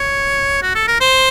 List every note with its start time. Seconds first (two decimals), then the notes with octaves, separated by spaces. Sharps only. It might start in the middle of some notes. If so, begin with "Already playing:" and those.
Already playing: C#5
0.63 F#4
0.75 A4
0.88 A#4
1.01 C5